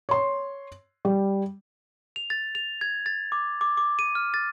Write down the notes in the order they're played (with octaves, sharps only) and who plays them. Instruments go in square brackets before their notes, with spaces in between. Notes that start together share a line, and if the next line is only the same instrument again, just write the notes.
[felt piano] C#5 C6
G3
[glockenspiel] F7
A6
F7
G#6
A6
D6
D6
D6
D#7
F6
A6